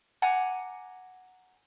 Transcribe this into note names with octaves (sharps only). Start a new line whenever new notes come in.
F#5 G#5 A#5 D6